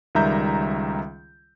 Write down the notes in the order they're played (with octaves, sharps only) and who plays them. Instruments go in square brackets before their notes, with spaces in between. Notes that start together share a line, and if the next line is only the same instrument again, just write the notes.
[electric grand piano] C#2 D#3 G3 E5 A#5 G6